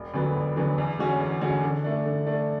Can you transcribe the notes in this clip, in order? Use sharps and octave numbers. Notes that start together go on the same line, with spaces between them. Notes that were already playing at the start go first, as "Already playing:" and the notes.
Already playing: E1
D2 D3 F#3 B3
E1
D2 D3 F#3 B3
E2
D3 G#3 C#4 F#4
E2
D3 G#3 C#4 F#4
D3
A3 D4
D3
A3 D4